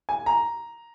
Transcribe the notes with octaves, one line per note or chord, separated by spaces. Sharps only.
G#5
A#5